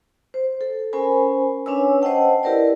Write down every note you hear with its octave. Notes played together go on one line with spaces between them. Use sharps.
C5
A4
C#4 A#4 C5 G#5 B5
C#4 D4 B4 C#5 G#5 E6
C5 D#5 F#5 G5 A5
E4 G4 A#4 B4 D5